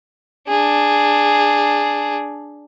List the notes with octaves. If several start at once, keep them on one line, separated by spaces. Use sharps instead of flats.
D4 G#4